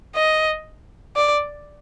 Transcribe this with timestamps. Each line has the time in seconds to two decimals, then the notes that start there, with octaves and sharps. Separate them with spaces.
0.15 D#5
1.16 D5